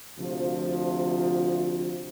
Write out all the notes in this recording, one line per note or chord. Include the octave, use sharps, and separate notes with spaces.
D2 C3 F3